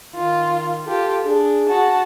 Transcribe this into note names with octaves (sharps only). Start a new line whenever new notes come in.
D#3 F4
F4 G4 A4
D4 G#4
F#4 A5